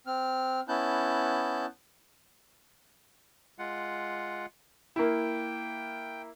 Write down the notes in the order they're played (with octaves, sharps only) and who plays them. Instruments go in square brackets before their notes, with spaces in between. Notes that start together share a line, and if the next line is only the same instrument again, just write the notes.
[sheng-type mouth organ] C4 F6
B3 C#4 E4 A5 F#6 G6
[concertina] G#3 F4 F#5
[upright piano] A#3 E4 [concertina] G5